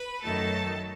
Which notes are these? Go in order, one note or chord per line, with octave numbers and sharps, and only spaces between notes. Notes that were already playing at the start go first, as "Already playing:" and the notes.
Already playing: B4 B5
F#2 D#3 F#3 A3 A4 A5